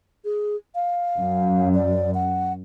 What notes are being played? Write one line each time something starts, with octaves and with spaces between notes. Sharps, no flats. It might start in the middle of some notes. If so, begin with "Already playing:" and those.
G#4
F5
F#2
D5
F#5